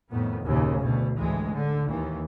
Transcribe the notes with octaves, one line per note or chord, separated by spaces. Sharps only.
F2 A2 D#3 B3
F#1 D#2 A#2 C#3
D2 B2
A1 D2 E3 G#3
D3
D#2 E3